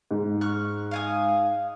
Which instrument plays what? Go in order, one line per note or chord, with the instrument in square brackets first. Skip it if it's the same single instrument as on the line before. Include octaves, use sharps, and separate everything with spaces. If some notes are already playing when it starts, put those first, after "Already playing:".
[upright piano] G#2
[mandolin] C#6 F6 F#6
F5 G#5 D#6